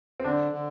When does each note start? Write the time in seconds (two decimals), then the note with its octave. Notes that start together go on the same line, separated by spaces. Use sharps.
0.20 C4
0.24 D3 D4
0.52 D3